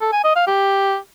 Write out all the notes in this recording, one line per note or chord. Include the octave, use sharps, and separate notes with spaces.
A4
G#5
D#5
F5
G4